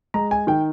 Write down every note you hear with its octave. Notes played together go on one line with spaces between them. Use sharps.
G#3 A#5
G#5
D#3 G5